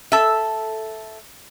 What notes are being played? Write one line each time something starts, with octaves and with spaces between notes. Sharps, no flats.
A4 E5